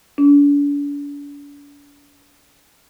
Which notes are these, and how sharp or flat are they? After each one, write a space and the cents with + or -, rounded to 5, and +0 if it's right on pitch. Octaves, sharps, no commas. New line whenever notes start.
D4 -40